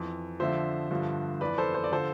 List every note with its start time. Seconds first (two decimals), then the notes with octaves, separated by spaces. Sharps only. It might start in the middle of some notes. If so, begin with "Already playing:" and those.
Already playing: F2 E3
0.40 F2 D3 F3 C5 E5
0.91 G2 D3 F3
1.41 F2 E3 B4 D5
1.58 A4 C5
1.74 C5
1.84 D5
1.92 D3 F3 A4 C5